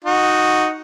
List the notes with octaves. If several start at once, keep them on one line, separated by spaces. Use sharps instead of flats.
D#4 F#4